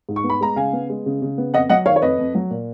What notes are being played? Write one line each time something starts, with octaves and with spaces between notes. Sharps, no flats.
G#2
C#6
B3
B5
G#3 A#5
C#3 F5 G#5
B3
G#3
C#3
C#3
B3
F2 D#5 F#5
F#3 D#5 F#5
D#3 C#5 F5
C#5
F2 B4 D#5
F2
F#3
A#2